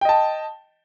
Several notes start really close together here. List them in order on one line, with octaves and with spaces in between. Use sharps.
G5 D#5 A5